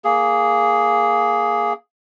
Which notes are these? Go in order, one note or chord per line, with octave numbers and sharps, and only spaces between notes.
A#3 G#4